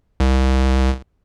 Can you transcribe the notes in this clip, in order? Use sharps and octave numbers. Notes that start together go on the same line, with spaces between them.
C2